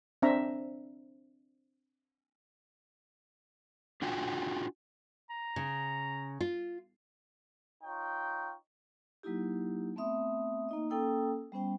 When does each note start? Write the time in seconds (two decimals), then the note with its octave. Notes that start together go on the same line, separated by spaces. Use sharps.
0.22 C4 D4 E5 A#5
4.02 D4 F4 F#4 G5 G#5
5.30 A#5
5.56 C#3
6.41 F4
7.84 D#4 F4 C#5 G5
9.23 F#3 A#3 D#4 E4 G4
9.96 A3 B3 C4 E5 D#6
10.69 A#3 D#4 D#5
10.90 A#3 C#4 A4 G5 D#6 E6
11.52 G3 B3 C#4 C5 G5